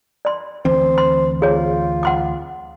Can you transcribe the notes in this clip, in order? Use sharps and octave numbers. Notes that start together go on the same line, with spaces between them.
D5 C6
D2 E3 C4 C5
C6
F4 G#4 C#5
F#5 C6 D6